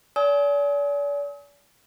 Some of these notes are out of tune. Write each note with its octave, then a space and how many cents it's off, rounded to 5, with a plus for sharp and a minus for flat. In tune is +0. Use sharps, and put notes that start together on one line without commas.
D5 -40 G#5 +25 D#6 +45